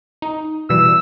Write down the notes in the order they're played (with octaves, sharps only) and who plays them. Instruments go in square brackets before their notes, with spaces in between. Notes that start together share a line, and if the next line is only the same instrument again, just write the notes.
[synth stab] D#4
[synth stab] B2 E3 G3 [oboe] E6